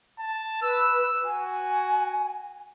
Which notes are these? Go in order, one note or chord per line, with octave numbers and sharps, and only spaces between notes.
A5
B4 E6
F#4 G#5